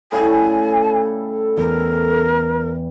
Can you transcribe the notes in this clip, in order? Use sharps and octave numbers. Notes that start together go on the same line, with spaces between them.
A2 C#3 G3 A4 G#5
E2 A#4